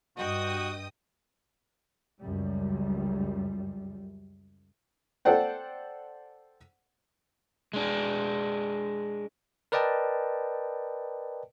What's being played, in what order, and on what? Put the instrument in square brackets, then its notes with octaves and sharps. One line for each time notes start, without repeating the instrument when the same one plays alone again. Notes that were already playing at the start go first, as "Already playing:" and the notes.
[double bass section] G2 [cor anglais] F#4 [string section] D#5 G5 D#6
[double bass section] C#2 F#2 G3
[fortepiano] A4 C5 D5 F#5 G5
[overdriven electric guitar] G#3 D4
[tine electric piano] A#4 B4 D5 D#5 G5 A5